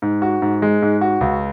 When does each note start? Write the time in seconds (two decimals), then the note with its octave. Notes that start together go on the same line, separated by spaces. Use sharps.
0.02 G#2
0.22 F#4
0.42 G#2
0.62 G#3
0.82 G#2
1.01 F#4
1.21 C#2